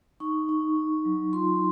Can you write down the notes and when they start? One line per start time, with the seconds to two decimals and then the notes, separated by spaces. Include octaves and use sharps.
0.20 D#4 C#6
0.49 D#4
0.76 D#4
1.05 F#3
1.33 F4 C6